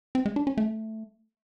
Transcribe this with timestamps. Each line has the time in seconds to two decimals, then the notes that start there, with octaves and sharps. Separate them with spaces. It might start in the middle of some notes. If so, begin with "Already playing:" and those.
0.15 C4
0.26 G#3
0.36 D4
0.47 C#4
0.58 A3